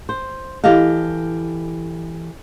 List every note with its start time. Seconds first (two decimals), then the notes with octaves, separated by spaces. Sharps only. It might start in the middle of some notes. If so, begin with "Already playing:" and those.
0.09 C5
0.64 E3 G4 A4 D#5 F5